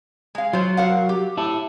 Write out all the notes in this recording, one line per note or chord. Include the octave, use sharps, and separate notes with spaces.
G#3 F5
F#3 F4 C5
A#4 F5 F#5
G4
E4 A5